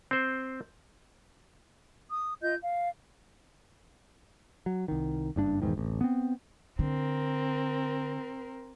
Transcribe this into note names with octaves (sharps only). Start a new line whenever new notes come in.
C4 C5
D#6
F4 D#5 G6
F5
F#3
C2 D#3
F#1 G2 D4
B1 E2 G#2 D#3
D1 A1
B3 C4
D3 C4 A#4